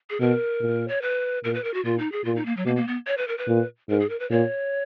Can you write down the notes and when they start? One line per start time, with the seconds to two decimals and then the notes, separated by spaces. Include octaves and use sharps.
0.10 G#4
0.20 B2 A#4
0.61 A#2
0.88 C#5
1.02 B4
1.44 A#2 A#4
1.54 B4
1.64 A#4
1.74 F#4
1.85 A#2 F4
1.99 D#4
2.12 G#4
2.25 A#2 F4
2.36 D#4
2.46 A#3
2.57 F#3
2.66 B2 A#3
2.76 A#3
2.88 B3
3.07 C#5
3.17 B4
3.28 A#4
3.38 B4
3.48 A#2
3.89 G#2 A#4
4.00 G#4
4.09 A#4
4.20 B4
4.31 A#2 C#5